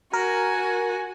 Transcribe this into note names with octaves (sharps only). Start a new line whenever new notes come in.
F#4 A#4 G#5